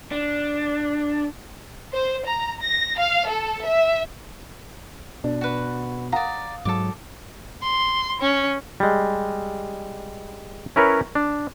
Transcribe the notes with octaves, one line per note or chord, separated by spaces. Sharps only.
D4
C5
A#5
A#6
F5
A4
E5
B2 D4
F#4 B4
D5 F5 F#5 A#5 D#6
G#2 F#3 A4 D6
C6
C#4
G3 G#3
C#4 E4 A#4 B4 C#5
D4